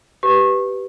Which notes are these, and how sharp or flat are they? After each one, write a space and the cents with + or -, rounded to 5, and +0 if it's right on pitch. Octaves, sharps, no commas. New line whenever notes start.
G4 -15 B4 +0 C#6 -25